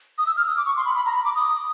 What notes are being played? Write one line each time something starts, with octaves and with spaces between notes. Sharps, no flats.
D#6
E6
F6
D#6
D6
C#6
C6
B5
B5
A#5
B5
D6
D#6